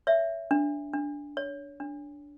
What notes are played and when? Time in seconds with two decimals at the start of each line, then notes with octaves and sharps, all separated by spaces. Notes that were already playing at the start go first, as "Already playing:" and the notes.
0.07 C#5 E5
0.51 D4
0.93 D4
1.37 C#5
1.80 D4